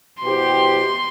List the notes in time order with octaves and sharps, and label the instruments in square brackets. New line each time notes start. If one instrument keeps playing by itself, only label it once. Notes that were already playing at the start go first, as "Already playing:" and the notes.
[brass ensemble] B2 B3 E4 G4 C5 [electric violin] C6